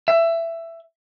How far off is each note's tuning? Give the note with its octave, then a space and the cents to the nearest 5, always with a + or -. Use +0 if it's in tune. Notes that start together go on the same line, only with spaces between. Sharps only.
E5 +15